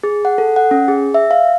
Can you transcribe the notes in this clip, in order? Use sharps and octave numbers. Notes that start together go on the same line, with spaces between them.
G#4
F#5
A4
F#5
C#4
G#4
E5
F5